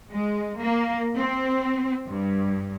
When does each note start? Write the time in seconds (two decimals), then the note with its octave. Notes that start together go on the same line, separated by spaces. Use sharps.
0.11 G#3
0.59 A#3
1.16 C4
2.08 G2